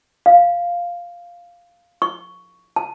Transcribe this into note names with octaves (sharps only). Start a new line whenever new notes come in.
F5
C#6
A5